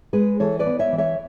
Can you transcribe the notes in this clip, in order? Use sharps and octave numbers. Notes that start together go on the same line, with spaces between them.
G#3 G#4 B4
E3 A4 C#5
B4 D5
B3
C#5 E5
E3
C#5 E5